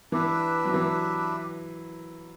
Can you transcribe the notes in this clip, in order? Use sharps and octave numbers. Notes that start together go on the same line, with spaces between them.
E3 D4 G4 B4 E5
F#3
E3 D4 G4 B4 E5